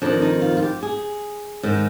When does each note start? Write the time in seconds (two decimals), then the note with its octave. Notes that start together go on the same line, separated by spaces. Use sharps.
0.02 F2 D#3 D4
0.22 D#4
0.42 F4
0.57 F4
0.63 G4
0.83 G#4
1.63 G#2 D#3